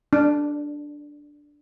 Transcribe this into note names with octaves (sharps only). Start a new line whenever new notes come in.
D4